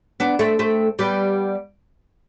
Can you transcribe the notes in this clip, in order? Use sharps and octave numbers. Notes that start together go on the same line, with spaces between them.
B3 D4
A3 C4
A3 C4
G3 B3